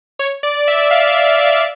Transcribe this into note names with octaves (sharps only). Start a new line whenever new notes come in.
C#5
D5
E5
F5
F5
E5
D5
F5